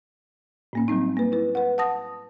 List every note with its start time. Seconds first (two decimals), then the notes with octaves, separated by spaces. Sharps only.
0.73 A2 A#3 C#4
0.88 F#3 G3 C4 D#4
1.17 A#3 B4
1.32 E4 B4
1.55 B4 F#5
1.78 F#5 A5 D#6 A#6